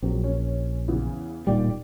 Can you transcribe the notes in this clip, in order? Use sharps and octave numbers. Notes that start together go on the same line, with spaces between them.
A#1 F#3 C4
C#4
E2 C#3 E3
D1 A#2 G3 D#4 G4 D5